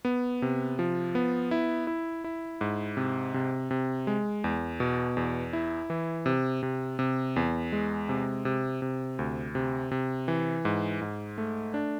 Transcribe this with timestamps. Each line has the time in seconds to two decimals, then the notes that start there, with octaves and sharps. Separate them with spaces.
0.05 B3
0.42 C3
0.79 F3
1.15 B3
1.51 E4
1.87 E4
2.24 E4
2.61 G#2
2.97 C3
3.34 C3
3.71 C3
4.07 G#3
4.44 E2
4.80 B2
5.17 E2
5.53 E4
5.90 E3
6.26 C3
6.63 C3
6.99 C3
7.36 E2
7.72 G#3
8.09 C3
8.45 C3
8.82 C3
9.19 D2
9.55 C3
9.91 C3
10.28 E3
10.65 G#2
11.01 G#2
11.38 A3
11.74 D4